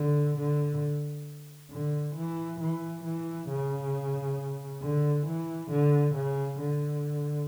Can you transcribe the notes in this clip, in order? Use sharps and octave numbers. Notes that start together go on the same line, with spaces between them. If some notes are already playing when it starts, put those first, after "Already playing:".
Already playing: D3
D3
D3
E3
E3
E3
C#3
D3
E3
D3
C#3
D3